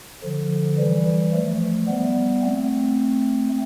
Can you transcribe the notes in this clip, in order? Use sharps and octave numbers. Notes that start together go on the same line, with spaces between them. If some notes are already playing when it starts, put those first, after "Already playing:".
D3 F3
E3 G3
F3 A3
G3 B3
A3 C4